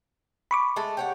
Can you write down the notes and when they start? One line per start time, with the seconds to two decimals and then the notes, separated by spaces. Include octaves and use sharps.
0.51 B5 C#6 D6
0.76 G#3 A3 A4
0.97 G4 C#5 F#5